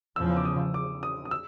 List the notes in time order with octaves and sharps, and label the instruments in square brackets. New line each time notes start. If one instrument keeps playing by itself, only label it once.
[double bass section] E2 C#3 F3 [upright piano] E6
[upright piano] D6
D#6
D6
D#6
D#6
E6